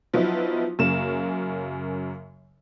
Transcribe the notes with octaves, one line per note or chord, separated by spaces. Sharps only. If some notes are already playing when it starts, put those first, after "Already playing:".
F3 F#3 B3 D#4 E4
F#2 C#3 A#3 A#4 E7